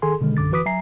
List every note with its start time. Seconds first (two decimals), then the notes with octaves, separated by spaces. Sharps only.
0.02 D#3 G#4 A4 G#5 C6
0.21 B2 D3 D#3 G#3
0.37 A#1 F#2 D3 D6 A6
0.52 E3 F#4 B4 D6 D#6 B6
0.66 F#3 E5 G#5 A#5 C7